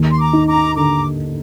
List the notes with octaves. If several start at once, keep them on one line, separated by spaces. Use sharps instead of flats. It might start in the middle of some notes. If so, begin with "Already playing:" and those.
Already playing: D#2
C6
A#5 D6
D#4
A#5 D6
D3 A#5 D6